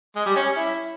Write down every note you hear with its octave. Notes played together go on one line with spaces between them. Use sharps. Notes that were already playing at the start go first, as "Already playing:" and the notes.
G#3
G3
C#4
C#4
E4